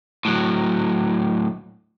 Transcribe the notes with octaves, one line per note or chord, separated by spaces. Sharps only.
A2 F#3